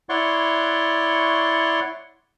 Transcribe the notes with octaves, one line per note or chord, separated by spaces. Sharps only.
E4 C#5 D5 F#5 C6 C#6